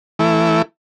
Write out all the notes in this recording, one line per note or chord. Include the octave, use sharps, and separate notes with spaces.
E3 A3 E4